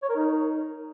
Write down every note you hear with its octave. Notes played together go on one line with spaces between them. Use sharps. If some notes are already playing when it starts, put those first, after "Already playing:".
C#5
A#4
D#4